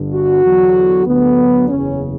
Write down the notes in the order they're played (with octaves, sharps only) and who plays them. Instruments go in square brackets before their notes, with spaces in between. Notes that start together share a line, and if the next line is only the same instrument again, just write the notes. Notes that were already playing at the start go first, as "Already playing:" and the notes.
Already playing: [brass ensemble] G1 G2 D3
F#4
E2 D3 F#3
D2 D3 F#3 B3
F#1 E2 C#3 C#4